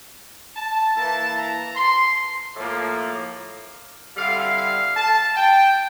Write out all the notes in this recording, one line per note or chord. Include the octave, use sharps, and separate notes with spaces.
A5
E3 A#3 E4 A5
A#5
C6
A2 F3 A#3
D3 G3 C4 E4 F5
F5
A5
G5